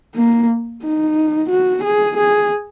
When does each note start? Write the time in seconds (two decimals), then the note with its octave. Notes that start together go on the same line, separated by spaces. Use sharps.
0.16 A#3
0.84 D#4
1.50 F#4
1.84 G#4
2.17 G#4